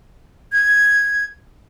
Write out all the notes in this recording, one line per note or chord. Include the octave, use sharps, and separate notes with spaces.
G#6